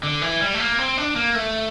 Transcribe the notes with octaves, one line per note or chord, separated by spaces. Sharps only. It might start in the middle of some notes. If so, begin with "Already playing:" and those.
D3
E3
G3
A3
A#3
C4
D4
A#3
A3